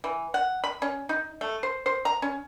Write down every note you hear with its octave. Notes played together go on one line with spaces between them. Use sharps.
E3
F#5
B5
C#4
D#4
A3
C5
C5
A#5
C#4